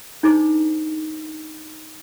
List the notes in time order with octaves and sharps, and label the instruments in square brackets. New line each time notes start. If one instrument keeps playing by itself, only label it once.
[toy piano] D4 D#4 A4 C5 D6